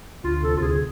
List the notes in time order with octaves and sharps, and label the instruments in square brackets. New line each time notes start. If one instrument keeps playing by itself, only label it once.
[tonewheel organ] D2 [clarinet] F4
[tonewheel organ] C3 [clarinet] A4
[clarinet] F4
[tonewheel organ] D2 [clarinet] G#4